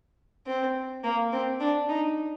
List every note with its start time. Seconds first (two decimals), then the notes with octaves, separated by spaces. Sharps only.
0.47 C4
1.04 A#3
1.32 C4
1.60 D4
1.89 D#4